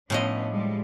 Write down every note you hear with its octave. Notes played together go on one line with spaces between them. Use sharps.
A2 F3 B3 C#4 D4 D#5
G3 G#3